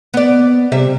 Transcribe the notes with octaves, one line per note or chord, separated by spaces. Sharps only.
B3 D5
C3 G3 E5